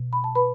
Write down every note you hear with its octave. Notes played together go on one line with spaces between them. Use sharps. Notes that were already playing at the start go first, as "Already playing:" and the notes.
Already playing: B2
B5
A5
B4 B5